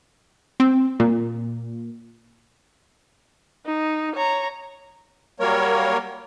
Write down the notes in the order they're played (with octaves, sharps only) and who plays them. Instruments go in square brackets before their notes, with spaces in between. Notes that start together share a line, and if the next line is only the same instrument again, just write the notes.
[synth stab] C4
A#2
[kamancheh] D#4
C#5 A#5
[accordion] F#3 G3 A#3 A#4 C#5